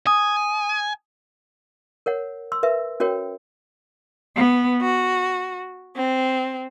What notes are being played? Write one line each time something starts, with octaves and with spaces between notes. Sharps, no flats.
G#5 D#6
A#4 C#5 F#5
C6 E6
A#4 B4 E5
C#4 F#4 A#4 C#5 G5
B3
F#4
C4